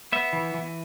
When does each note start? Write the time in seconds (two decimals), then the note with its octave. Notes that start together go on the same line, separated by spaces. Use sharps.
0.12 B3 E5
0.33 E3
0.54 E3